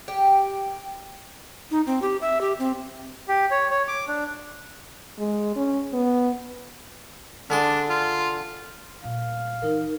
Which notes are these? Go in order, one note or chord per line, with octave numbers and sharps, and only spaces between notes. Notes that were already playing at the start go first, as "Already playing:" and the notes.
G4
D#4
C4
G4
E5
G4
C4
G4
C#5
C#5
D6
D4
G#3
C#4
B3
D3 D4 G#4 C6
F4
A#2 G3 F5
E3 D#4 A#4